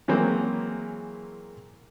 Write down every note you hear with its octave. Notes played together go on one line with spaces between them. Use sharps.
E3 F#3 G#3 A#3 C4